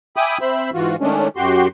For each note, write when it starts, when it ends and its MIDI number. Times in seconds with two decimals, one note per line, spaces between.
0.16 0.38 76
0.16 0.38 79
0.16 0.38 80
0.16 0.38 83
0.16 0.38 86
0.16 0.38 87
0.41 0.70 60
0.41 0.70 72
0.41 0.70 76
0.41 0.70 83
0.74 0.96 44
0.74 0.96 52
0.74 0.96 65
0.74 0.96 66
1.01 1.28 51
1.01 1.28 56
1.01 1.28 57
1.01 1.28 61
1.01 1.28 62
1.36 1.68 42
1.36 1.68 66
1.36 1.68 67
1.36 1.68 84